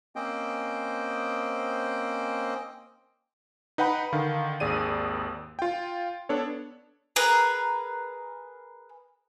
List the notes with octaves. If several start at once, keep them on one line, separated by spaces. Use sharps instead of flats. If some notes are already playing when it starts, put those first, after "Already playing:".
A#3 C4 C#4 C5 D#5 G5
D#4 B4 F#5 G5 B5
D3 D#3 F5
G#1 D#2 G#4 D5 D#7
F4 G5
B3 D4 A4 C#5
G#4 A#4 B4